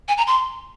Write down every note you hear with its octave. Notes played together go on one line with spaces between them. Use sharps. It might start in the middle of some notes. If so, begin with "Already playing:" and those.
G#5
A#5
C6